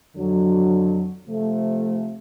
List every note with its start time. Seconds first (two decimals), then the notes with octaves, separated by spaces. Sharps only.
0.15 F2 D3 F#3
1.27 C3 F3 A3